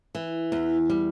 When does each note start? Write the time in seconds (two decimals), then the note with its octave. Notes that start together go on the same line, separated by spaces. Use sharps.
0.15 E3
0.52 E2
0.90 G3